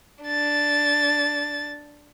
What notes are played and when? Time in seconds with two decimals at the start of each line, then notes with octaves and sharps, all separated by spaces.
0.24 D4 A6